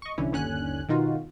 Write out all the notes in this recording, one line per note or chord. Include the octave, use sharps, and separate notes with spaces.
D#5 C#6
C2 D3 E3 C#4 E4
G1 D#2 D3 C#4 G#5 F#6
B2 D#3 D#4 F4 F#4